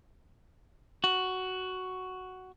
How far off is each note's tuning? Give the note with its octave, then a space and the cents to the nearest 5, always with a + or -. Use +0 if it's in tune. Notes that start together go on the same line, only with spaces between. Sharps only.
F#4 +5